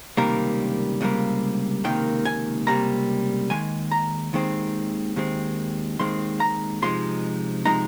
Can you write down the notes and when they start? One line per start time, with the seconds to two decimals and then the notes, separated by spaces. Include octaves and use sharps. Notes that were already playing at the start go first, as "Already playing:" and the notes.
0.17 C#2 C3 D#3 G3 A#3 A#4
1.01 C#2 C3 D#3 G3 A#3
1.84 C#2 C3 D#3 A#3 G5
2.25 G#5
2.67 C#2 C3 D#3 G3 A#3 A#5
3.50 D#2 D#3 G#3 G#5
3.91 A#5
4.33 D#2 D#3 G#3 C4
5.16 D#2 D#3 G#3 C4
5.99 D#2 D#3 G#3 C4 C6
6.40 A#5
6.82 C3 F3 G#3 D#4 C6
7.65 C3 F3 G#3 D#4 A#5